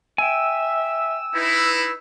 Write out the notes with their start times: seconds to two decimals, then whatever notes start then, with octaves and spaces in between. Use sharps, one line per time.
0.18 E5 G5 G#5 E6
1.34 D#4 E4 B4